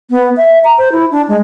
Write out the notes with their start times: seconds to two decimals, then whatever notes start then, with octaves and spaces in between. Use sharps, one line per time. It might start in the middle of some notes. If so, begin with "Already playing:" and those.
0.10 B3
0.37 E5
0.64 A#5
0.78 C5
0.92 E4
1.11 D4
1.28 G#3